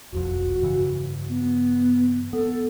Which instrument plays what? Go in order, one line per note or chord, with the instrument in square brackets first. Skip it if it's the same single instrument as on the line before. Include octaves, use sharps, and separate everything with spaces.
[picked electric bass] F1 B1 F2 [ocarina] F#4
[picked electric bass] G2 C#3 E3
[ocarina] B3
[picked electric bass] B3 [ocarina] A4